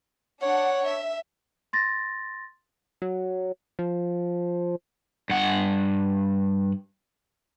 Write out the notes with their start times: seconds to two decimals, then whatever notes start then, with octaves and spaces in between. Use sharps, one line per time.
0.42 D4 C#5 F#5
0.87 E5
1.73 C6 A6 A#6
3.02 F#3
3.79 F3
5.30 G2 F#5